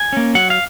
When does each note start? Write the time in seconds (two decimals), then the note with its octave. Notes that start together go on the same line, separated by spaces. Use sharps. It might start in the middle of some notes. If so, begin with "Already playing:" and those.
Already playing: G#5
0.13 A#3 C#4
0.35 F#3 F#5
0.50 F5